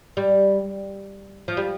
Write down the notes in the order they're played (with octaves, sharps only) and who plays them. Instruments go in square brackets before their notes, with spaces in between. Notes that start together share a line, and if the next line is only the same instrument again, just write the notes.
[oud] G3
F3
G3